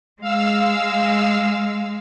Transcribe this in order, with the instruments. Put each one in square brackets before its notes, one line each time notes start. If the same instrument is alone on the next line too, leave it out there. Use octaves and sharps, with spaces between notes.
[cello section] G#3 [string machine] F5 E6